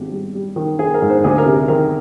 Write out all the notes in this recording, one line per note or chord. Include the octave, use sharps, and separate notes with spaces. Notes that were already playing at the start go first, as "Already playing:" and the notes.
Already playing: G#1 G4
G3
G3
D#3
D#3 G#4
A#4
G#2
C5
D2 G#4
A#4
C3
D#3 A#4